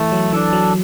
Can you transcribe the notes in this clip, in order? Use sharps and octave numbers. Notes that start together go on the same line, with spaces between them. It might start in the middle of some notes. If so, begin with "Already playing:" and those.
Already playing: E3 A3
F#3
E3 D4 A4
F#3